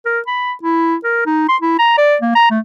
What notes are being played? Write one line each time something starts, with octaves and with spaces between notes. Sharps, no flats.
A#4
B5
E4
A#4
D#4
C6
E4
A#5
D5
A#3
A#5
A3